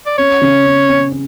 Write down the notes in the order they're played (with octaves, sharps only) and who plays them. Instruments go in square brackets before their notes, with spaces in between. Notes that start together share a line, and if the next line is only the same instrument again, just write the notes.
[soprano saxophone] D5
[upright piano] C#4 [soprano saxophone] C#5
[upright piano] C#3
C#4
C#4
C#4